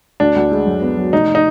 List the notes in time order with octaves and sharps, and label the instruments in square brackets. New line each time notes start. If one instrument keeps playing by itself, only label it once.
[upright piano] D2 [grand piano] D4
[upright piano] D2
G#3
F#2
B3
F#3
[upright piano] F1 [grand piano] D#4
[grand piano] D#4